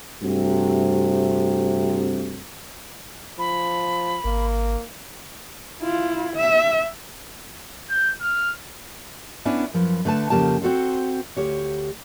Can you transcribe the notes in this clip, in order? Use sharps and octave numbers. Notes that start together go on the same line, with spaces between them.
G2 C3 A3 C4 F#4
F3 B5
G#1 A#3
E4 F4
E5
G6
F6
B3 C#4 D4 E4
F#2 F3 B4
D3 A3 B4 A5
F2 G#2 C#3 A#3 G4 A5
C4 F#4 A4 C5
D2 G4 C#5